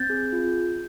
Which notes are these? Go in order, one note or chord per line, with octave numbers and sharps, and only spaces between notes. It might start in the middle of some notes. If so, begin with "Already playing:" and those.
Already playing: C4 G6 A6
G#4
F4